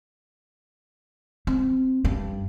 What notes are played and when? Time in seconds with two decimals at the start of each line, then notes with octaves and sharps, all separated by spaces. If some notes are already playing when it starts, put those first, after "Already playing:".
1.47 C4
2.05 G2